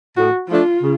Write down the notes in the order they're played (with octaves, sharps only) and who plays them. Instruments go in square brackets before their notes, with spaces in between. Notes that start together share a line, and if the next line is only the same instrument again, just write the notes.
[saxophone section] A2 [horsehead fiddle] F#4
[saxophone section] F3 A3 D4 [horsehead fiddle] F4
[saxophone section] C#3